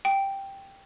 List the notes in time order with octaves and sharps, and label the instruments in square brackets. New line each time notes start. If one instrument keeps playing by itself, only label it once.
[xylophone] G5